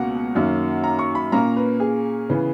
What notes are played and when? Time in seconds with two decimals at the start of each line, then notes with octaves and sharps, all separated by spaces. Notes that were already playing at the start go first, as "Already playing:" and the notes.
Already playing: C#2 B2 A#3 C#4 F#5
0.35 F#2 D#3 A#3 C#4
0.84 A#5
0.99 C#6
1.15 B5
1.32 A#2 A#3 C#4 A#5
1.56 B4
1.80 G#4
2.30 C#3 E3 B3